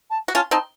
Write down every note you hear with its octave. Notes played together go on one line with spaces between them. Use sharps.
A5
F#4
C#4 F4 A5
C4 D#4 A5